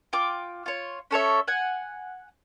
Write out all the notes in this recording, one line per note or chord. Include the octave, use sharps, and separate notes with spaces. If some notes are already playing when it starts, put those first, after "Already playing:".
F4 G5 D6
F4 C#5
C#4 A4 C#5 E5
F#5 G#5